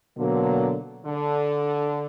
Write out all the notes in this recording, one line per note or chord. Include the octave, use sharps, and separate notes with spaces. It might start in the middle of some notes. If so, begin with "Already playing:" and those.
B2 D3 F#3 A#3
D3